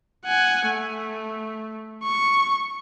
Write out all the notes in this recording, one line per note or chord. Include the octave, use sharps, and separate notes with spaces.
F#5 G#5
A3
C#6